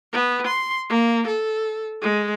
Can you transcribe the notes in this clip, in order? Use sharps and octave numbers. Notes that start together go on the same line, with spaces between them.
B3
C6
A#3
A4
G#3